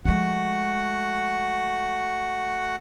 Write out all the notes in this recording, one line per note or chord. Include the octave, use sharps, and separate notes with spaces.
F3 G#3 A3 F#4 F#5